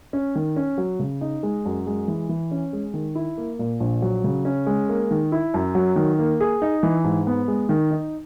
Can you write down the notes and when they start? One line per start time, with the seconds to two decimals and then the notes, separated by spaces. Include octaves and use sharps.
0.13 C#4
0.35 D#3
0.56 C#4
0.78 F#3
0.99 C#3
1.21 D#4
1.43 G#3
1.65 F#2
1.87 G#3
2.08 E3
2.29 E3
2.51 C#4
2.73 G#3
2.94 D#3
3.15 E4
3.37 A#3
3.59 A#2
3.80 A#1
4.02 F#3
4.24 C#3
4.45 C#4
4.66 G#3
4.89 A#3
5.11 D#3
5.32 E4
5.54 F#2
5.75 F#3
5.96 D#3
6.19 A#3
6.40 G#4
6.62 D#4
6.83 E3
7.04 G#2
7.27 B3
7.48 G#3
7.69 D#3
7.91 D#4